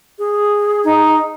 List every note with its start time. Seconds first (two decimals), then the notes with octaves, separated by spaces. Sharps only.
0.19 G#4
0.84 D#4